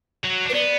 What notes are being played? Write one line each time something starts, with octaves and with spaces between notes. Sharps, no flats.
F#3
D4
B4
B3 D5